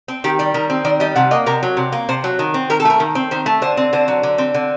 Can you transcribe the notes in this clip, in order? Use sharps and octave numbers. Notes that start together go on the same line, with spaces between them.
C4
D#3 G4
G3 D5
D#3 A#4
C4
D#3 D5
G3 D#5
C3 F#5
A#3 D#5
C3 A#4
F#3
C3
A#3
C3 C5
F#3
D#3
C4
D#3 A#4
A4
A3 A#4
D#3
C4
D#3 C5
A3
D3 C5
C4
D3 C5
F#3
D3
C4
D3